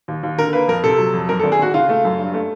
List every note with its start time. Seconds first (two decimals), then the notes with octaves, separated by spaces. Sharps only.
0.08 D#2
0.23 D#2
0.38 D3 A#4
0.53 A#3 B4
0.68 F2 A#4
0.84 C3 A4
0.99 F#3
1.13 F2
1.29 F#2 A#4
1.39 A4
1.44 G#1
1.52 G#4
1.59 G#1 F#4
1.74 C#3 F4
1.89 A3
2.05 F#2
2.19 G2
2.34 A3